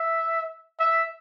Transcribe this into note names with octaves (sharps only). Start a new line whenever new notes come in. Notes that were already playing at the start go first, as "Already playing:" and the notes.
Already playing: E5
E5